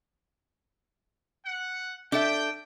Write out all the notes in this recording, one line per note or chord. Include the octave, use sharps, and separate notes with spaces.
F#5
D4 A4 E5 G5